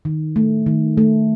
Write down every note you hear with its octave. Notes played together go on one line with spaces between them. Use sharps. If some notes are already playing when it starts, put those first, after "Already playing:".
D#3
A3
D#3
A3